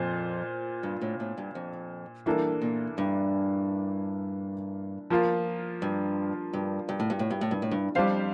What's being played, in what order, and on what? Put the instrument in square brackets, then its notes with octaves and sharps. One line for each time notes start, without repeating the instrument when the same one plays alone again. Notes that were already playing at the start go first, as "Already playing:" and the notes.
Already playing: [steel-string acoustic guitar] F2 [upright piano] A#2 F4 C5
[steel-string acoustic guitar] G2
A2
A2
G2
F2
[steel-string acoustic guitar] G2 [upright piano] E3 A#3 D4 A4
[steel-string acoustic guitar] A#2
G2
[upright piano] F3 A#3 F4
[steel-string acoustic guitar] G2
G2
G2
A2
G2
A2
G2
A2
G2
A2
G2
[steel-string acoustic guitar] F2 [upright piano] G3 D4 G4 C5 F5